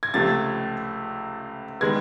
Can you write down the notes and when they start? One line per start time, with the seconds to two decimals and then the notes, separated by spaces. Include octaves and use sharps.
0.03 G#6
0.14 C#2 C3 F3 A3 A6
1.81 D#3 G#3 B3 G#6